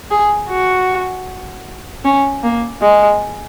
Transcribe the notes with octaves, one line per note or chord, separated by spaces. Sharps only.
G#4
F#4
C#4
A#3
G#3